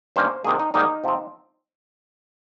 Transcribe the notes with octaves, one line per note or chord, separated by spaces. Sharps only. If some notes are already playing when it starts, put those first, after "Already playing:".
G2 D#3 A#3 C#4 C5
C3 D#3 A#3 G#4
D#4
G#2 D#3 G3 A#3 D#4
C3 F3 C4